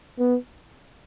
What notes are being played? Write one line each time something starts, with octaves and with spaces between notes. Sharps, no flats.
B3